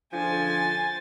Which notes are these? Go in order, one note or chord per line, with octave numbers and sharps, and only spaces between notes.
D3 F3 C5 G#5 A6